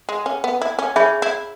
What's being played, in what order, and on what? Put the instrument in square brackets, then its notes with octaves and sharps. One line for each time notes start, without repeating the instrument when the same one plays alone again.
[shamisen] G#3
C#4
B3
E4
C#4
[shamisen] C#4 [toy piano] G#4 C#5 E5 B5
[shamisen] E4